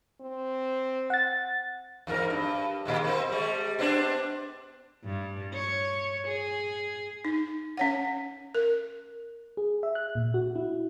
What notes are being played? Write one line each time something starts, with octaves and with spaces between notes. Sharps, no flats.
C4
F#5 A6
E2 G#2 A#4
G2
A#2 D#3 G#3
A#3 C4
G3 G#3
B3 C4 D4
G2
C#5
G#4
D#4
C#4 C#5 F#5
A#4
G#4
E5
F#6
A#2
F#4
E4